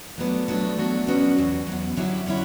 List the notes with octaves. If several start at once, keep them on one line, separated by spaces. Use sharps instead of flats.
F#3 A3 B3 D4
F#3 B3 D4
F#3 B3 D4 F#4
F#3 B3 C#4 D4 F#4
E2 B2 F#3
E2 B2 F#3
D3 F#3 C#4 E4 G4
D3 F#3 C#4 E4